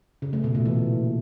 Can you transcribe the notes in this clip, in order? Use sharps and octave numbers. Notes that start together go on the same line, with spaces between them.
C#3
A3
B2
A#2
E3